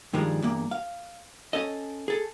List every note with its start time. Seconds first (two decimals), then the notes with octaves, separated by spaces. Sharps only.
0.13 G2 D#3 F3 G3 G#3
0.42 E2 G2 A#3
0.71 F5
1.53 C#4 A4 D#5
2.08 G#4 A4